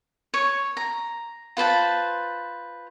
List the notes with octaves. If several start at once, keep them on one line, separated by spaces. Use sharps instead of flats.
C#5
A#5
F4 B4 C5 A5